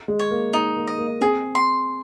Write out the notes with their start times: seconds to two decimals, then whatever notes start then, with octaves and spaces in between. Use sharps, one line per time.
0.08 G#3
0.19 C#5
0.31 A#3
0.53 A#3 D#4
0.77 A#3
0.87 D#5
0.98 A#3
1.21 C4 G#4
1.55 C6